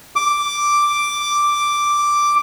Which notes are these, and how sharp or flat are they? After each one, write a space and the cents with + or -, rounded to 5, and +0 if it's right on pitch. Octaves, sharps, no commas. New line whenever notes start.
D6 +0